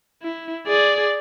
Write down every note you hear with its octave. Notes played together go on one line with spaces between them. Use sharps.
E4
G#4 D5